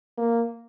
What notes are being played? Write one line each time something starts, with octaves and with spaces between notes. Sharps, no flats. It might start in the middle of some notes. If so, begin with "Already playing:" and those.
A#3